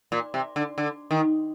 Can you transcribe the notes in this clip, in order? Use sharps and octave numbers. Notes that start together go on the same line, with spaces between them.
A#2
C3
D3
D3
D#3